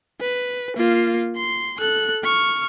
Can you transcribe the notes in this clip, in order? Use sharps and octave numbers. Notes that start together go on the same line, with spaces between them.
B4
A#3 F4
C6
A4 F#6
C#6 F6